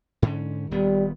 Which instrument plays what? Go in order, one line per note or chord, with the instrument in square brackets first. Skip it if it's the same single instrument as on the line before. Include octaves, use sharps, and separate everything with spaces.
[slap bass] G#2 D3 C#4
[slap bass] D#1 D#3 B3 [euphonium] G3